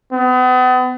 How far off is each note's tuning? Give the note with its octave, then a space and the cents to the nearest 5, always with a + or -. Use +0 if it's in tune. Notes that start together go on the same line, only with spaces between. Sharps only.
B3 +40